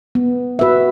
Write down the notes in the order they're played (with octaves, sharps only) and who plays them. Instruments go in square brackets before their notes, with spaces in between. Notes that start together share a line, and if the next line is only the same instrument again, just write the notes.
[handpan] B3
F#4 B4 E5